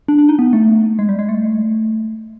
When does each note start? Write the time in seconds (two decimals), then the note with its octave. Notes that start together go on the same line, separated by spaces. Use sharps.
0.08 D4
0.18 D4
0.29 D#4
0.39 B3
0.53 A3
0.99 G#3
1.09 G3
1.19 G#3
1.29 A3